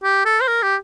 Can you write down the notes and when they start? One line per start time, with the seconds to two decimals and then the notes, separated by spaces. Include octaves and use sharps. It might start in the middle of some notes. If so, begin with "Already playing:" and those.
0.03 G4
0.25 A4
0.41 C5
0.48 A#4
0.63 G4